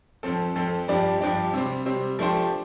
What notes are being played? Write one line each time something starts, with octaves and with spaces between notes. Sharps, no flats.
F2 F3 C4 A4
F2 F3 C4 A4
G2 F3 D4 G4 D5
G2 F3 D4 G4 D5
C3 G3 C4
C3 G3 C4
F3 A3 D4 G4 C5